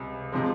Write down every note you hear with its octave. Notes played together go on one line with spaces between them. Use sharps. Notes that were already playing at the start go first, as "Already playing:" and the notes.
Already playing: C#2 C3 G3
C3 F3 G#3